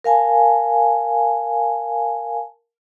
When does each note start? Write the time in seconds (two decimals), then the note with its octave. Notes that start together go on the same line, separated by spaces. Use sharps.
0.04 A#4 F5 G#5 A5